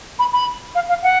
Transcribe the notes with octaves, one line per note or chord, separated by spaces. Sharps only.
B5
B5
F5
F5
F#5